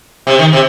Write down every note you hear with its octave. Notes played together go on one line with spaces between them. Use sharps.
C3
D#3
C3